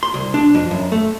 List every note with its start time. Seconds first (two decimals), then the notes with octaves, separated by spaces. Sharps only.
0.03 C6
0.14 C2
0.34 D4
0.55 F2
0.71 F#2
0.92 A3